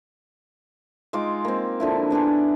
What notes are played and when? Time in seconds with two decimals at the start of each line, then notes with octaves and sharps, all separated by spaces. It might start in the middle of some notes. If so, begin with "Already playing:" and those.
1.13 G#3 D#4 F4 D6
1.45 A#3 C4
1.80 D3 F3 E4
2.11 B3 D4 G4 G#4